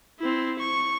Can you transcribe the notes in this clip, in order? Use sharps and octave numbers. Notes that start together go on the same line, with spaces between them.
C4 E4
C#6